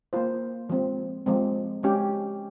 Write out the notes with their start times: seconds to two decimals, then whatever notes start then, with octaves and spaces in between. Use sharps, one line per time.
0.13 A#3 F4 C5
0.69 F3 G#3 C4
1.26 F3 G#3 C4
1.83 G#3 C#4 G4